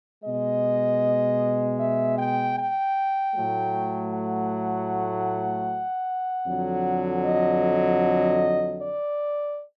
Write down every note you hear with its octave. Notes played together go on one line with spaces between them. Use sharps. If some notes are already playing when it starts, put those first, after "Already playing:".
B2 G#3 D#5
E5
G5
G5
A2 F#3 A3
F#5
F2 D3 F#3
D#5
D5